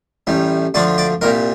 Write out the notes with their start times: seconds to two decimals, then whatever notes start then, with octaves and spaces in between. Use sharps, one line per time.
0.27 A1 A2 G3
0.74 D2 D3 F3 D5
0.98 D5
1.21 C2 A#2 G3 A#4